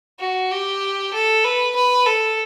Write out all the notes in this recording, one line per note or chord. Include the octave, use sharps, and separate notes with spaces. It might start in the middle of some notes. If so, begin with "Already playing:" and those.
F#4
G4
A4
B4
B4
A4